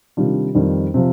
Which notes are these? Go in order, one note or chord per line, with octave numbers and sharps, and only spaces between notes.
C3 D#3 G3 D4 F4
F2 D#3 G3
C3 F3